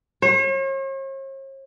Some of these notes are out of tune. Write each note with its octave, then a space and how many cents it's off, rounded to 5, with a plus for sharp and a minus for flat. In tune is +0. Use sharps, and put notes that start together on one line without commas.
C#5 -45